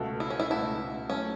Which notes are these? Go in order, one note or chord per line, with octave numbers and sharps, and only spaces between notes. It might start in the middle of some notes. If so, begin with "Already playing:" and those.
Already playing: C#2 B2 A3 F#4 A4
E4
C#4
E4
C#2 B2 A3 E4 F#4 A4
F#3 A3 C#4 E4